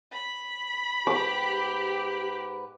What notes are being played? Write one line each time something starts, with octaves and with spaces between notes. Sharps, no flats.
B5
G#2 G4 B4 D6